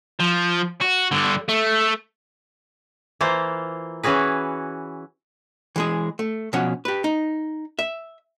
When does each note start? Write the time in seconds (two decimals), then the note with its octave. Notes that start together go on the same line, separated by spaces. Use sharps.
0.20 F3
0.81 F#4
1.11 G2 D3
1.49 A3
3.21 E3 A#3 F4 C5
4.03 E3 C#4 F#4 G#4 B4
5.76 E3 G#3 G#4
6.19 A3
6.53 B2 F3 C#4 F#5
6.85 G4 B4
7.04 D#4
7.79 E5